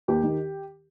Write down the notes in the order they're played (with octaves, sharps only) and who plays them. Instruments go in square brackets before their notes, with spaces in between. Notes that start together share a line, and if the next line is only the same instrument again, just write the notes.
[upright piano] D#2 G4
D#3